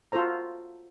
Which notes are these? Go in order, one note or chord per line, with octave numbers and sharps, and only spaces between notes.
F4 F#4 A4 C5 A#5